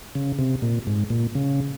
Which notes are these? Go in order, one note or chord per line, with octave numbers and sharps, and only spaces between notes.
C#3
C3
A#2
G#2
A#2
C#3